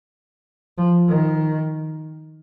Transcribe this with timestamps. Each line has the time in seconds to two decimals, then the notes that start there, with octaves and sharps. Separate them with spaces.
0.78 F3
1.08 D#3